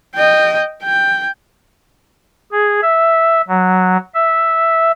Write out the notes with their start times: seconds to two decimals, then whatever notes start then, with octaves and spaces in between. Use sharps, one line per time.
0.15 D#5 G5
0.84 G5
2.52 G#4
2.82 E5
3.48 F#3
4.14 E5